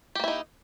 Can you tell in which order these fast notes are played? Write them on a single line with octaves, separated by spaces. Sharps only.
G4 A#3 E4 D#4